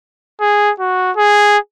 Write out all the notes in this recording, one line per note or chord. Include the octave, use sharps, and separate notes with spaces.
G#4
F#4
G#4